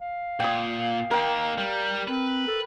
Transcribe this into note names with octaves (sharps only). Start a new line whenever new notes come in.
F5
A#2 G5 D#6
A#3 D#4 A#4 G5
G3
C4 B4
A4